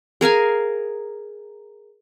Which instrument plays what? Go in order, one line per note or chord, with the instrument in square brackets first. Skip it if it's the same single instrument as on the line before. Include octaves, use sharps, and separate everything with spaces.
[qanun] G#4 A#4 F5 G#5